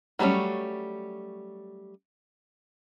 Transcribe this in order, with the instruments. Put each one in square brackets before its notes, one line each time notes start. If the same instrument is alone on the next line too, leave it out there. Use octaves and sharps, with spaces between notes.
[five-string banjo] F#3 G3 A3 B3 C#4